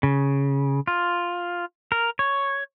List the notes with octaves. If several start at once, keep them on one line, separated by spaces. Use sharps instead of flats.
C#3
F4
A#4
C#5